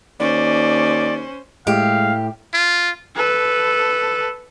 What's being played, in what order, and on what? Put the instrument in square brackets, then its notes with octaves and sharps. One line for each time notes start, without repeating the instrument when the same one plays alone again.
[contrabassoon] D#2 [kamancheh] C#4 C5 [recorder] D5
[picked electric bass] A2 [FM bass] G#3 [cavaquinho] G4 [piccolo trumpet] F5
[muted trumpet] F4
[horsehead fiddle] A4 B4